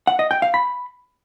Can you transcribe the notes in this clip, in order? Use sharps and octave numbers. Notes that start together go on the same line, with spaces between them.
F#5
D#5
G5
F5
B5